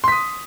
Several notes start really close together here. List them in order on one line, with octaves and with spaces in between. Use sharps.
C6 B6 D#6